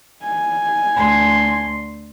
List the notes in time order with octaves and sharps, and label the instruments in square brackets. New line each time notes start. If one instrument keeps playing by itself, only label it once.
[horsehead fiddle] G#5
[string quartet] D2 C6